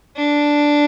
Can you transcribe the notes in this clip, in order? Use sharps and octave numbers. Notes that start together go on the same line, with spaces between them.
D4